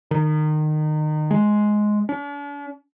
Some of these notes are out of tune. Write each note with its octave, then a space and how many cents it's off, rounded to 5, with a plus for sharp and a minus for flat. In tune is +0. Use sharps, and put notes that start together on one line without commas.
D#3 -25
G#3 +10
D4 -45